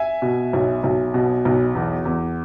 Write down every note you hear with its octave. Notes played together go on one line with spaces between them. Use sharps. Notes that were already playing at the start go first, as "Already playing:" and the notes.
Already playing: E5 G#5
B2
B1
B1
B2
B1
E2
E2